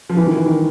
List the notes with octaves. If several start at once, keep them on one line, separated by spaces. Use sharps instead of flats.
F3
E3
D#3
E3
D#3